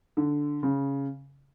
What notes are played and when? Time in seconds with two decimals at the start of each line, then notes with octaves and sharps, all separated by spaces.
0.17 D3
0.63 C#3